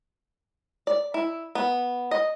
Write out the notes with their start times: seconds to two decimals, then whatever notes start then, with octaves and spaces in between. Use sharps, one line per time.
0.87 D5
1.14 E4
1.55 B3
2.11 D#5